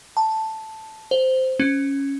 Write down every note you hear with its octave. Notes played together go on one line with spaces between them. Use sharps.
A5
C5
C#4